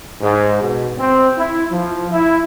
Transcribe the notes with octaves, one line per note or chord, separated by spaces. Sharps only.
G#2
B2
C4
E4
F3
E4